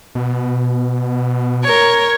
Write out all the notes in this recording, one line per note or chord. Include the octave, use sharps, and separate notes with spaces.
B2
A#4 C#5